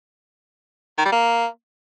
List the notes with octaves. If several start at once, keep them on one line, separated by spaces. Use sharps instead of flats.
D#3
G3
A#3